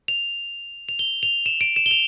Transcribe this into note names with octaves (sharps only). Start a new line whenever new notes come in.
F7
F7
G7
F7
E7
D7
E7
G7
F7